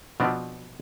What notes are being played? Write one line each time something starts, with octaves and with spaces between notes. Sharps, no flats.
B2 F3 B3 C4 D4